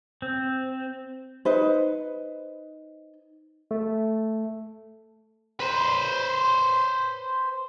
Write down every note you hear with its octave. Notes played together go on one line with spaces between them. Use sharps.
C4
D#4 B4 C5
A3
B4 C5